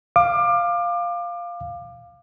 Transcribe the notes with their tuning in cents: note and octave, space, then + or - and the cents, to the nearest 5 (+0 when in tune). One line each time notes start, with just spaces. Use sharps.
F5 +0 D6 +25